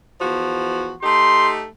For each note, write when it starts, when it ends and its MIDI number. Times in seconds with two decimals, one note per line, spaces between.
0.21 0.93 40
0.21 0.93 53
0.21 0.93 66
1.03 1.64 57
1.03 1.64 63
1.03 1.64 67
1.03 1.50 84